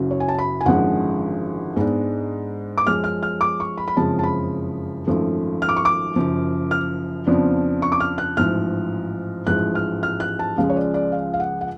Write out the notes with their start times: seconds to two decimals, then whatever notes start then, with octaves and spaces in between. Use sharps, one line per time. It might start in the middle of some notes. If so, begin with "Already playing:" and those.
Already playing: F#1 F#2 C#3 F#3
0.11 C#5
0.20 G#5
0.28 A5
0.39 B5
0.61 G#5
0.66 G#1 F#2 D3 F3 G#3 F#5
1.76 G#2 G#3 B3 D4
2.78 D6
2.87 F#2 F3 G#3 C#4 F6
3.04 F6
3.23 F6
3.41 D6
3.60 C#6
3.78 B5
3.88 B5
3.96 F#1 F2 F3 G#3 C#4 A5
4.19 A5
4.23 B5
5.07 G#1 F#2 F3 A3
5.62 F6
5.69 D6
5.76 C#6
5.85 D6
6.16 F#1 F#2 F3
6.71 F6
7.27 F2 C#3 F3 B3 D4
7.82 C#6
7.92 D6
8.00 F6
8.18 F#6
8.37 A1 G#2 F3 F6
9.47 A1 G#2 F3 G#3 F#6
9.75 F6
10.03 F6
10.20 F#6
10.39 A5
10.57 C#2 C#3 F3 G#3 F5
10.70 C#5
10.76 D5
10.94 D5
11.12 F5
11.34 F5
11.40 F#5
11.61 F#5